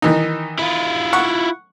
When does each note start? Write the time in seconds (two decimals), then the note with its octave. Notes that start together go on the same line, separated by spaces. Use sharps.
0.02 D#3 E3 D#4
0.59 E4 F4
1.13 F#5 C#6